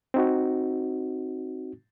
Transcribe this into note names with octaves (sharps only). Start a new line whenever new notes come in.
C4 D#4 F#4